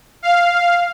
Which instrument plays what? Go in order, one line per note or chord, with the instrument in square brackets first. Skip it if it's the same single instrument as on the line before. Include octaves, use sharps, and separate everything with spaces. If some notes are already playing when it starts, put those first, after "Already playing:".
[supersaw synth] F5